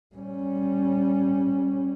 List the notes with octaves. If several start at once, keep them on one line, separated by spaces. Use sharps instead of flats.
G3 C#4